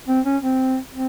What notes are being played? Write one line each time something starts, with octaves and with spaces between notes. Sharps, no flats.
C4
C#4
C4
C4